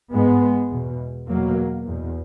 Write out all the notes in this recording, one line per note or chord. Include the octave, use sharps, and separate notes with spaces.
G#2 G#3 B3
E2 B2
E2 B2 F#3 A#3
E2 B2